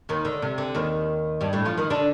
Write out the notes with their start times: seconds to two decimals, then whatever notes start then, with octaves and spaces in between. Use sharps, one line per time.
0.09 D#2 D#3
0.25 D3
0.42 C3
0.58 D3
0.75 D#2 D#3
1.41 G2 G3
1.53 A2 A3
1.65 F3 F4
1.78 D#3 D#4
1.90 D3 D4